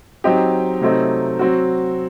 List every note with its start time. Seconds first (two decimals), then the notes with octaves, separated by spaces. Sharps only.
0.24 F#3 C4 D#4 G4
0.81 C3 F#3 A3 C4 D#4
1.39 F#3 C4 F#4